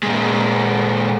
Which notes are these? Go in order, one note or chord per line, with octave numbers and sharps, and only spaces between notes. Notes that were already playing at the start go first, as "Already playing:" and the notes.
A#2 G#3